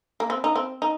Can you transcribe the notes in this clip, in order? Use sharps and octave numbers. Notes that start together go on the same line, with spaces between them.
A#3
C4
D#4
C4
D#4